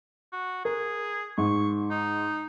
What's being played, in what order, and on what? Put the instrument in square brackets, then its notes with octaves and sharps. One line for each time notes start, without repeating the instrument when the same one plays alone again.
[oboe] F#4
[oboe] G#4 [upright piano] A#4
[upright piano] G#2 [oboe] C#6
[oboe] D#4